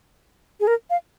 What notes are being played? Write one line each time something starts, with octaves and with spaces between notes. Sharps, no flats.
G#4
A#4
F5